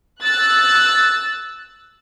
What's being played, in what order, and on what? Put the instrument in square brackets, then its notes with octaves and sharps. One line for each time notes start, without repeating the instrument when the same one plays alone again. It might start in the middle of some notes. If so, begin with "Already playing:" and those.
[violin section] E6 F#6 A6